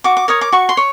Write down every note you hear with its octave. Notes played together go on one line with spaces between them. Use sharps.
F#4 D6
D6
A#4 C#5 D#6
D6
F#4 C#6
C6
C#5